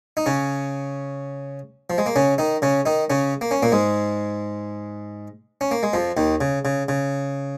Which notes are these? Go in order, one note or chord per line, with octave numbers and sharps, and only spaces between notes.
D#4
C#3 C#4
F3
G#3
A#3
C#3 C#4
D#3 D#4
C#3 C#4
D#3 D#4
C#3 C#4
A#3
C#4
A#2 A#3
G#2 G#3
C#4
A#3
G#3
F2 F3
D#2 D#3
C#3
C#3
C#3